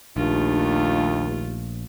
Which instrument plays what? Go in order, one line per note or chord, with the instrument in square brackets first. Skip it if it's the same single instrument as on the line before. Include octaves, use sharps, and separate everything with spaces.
[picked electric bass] A#1 [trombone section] D#2 [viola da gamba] A3 F4 [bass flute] D4